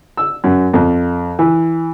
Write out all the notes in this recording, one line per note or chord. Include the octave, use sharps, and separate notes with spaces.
E6
F#2
F2
E3